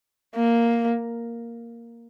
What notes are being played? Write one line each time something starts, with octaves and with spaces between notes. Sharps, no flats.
A#3